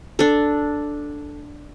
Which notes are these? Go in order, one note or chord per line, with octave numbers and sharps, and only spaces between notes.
D4 A4